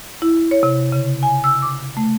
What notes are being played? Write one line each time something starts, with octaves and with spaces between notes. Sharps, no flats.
E4
C#5
C3
C#3
G#5
E6
D6
A3